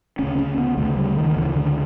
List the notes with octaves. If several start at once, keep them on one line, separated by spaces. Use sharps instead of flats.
D2 C#3 C#4
C#4
B3
D2 C#3 A3
G3
D#3
D2 C#3 E3
D3